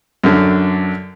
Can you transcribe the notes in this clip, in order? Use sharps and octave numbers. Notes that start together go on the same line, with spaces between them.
F#2 D3